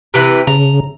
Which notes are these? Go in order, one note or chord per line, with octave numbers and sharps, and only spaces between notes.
C3 E3 B4
C#3 A#5